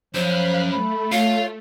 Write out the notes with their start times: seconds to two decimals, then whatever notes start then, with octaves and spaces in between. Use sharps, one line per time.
0.14 F#2 F3 C#4 C5 F5 B5 F#6
0.71 A3 B5
1.12 F4 C#5 F5